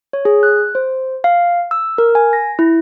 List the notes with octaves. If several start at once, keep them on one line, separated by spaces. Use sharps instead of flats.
C#5
G#4
F#6
C5
F5
E6
A#4
G#5
A#6
E4